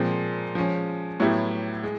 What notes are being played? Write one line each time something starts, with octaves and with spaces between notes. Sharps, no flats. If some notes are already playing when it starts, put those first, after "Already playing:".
Already playing: A#2 F3 G#3 C4
F3 G#3 C#4
A2 F#3 B3 E4 G4
G#3